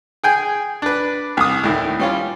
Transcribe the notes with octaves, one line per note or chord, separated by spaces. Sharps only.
G#4 G5 G#5
D4 B4
C2 D#6
D2 A2 D#3
G3 C#4 F4